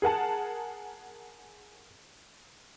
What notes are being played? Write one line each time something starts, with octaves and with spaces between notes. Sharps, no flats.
G#4 A#4 F#5 A5